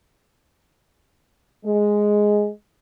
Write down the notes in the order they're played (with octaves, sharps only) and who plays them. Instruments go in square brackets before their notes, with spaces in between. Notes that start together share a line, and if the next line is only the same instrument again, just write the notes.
[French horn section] G#3